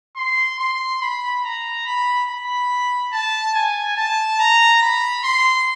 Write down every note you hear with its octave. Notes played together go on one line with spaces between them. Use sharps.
C6
C6
B5
A#5
B5
B5
A5
G#5
A5
A#5
B5
C6